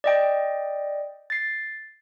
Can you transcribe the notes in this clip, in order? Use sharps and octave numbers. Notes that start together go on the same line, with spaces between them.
D5 D#5 G5
A6 C7